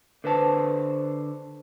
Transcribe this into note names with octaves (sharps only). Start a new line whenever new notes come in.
D3 B4 C5 A5